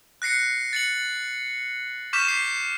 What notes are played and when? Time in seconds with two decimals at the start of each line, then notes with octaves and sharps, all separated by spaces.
0.22 F#6 A#6 C7 C#7
0.73 A6 C#7 F#7
2.13 C#6 D6 F6 G6 B6 E7
2.28 C7